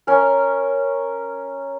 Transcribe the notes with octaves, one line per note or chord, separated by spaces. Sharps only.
C#4 A#4